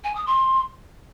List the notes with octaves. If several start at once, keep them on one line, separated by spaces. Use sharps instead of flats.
G#5
D#6
C6